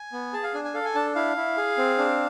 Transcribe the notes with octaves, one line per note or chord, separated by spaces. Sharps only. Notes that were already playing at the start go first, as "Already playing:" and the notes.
Already playing: G#5
B3
G#4 A5
F5
D4 G#5
G#5
A4 F5
G#5
D4 A5
E4 F5
E4
G#4
C4
D4